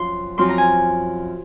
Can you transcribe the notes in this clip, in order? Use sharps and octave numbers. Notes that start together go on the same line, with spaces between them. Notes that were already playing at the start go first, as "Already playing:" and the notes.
Already playing: F#2 F3 C4 F4 C6
F#2 F3 C4 F4 C6
A#5
G#5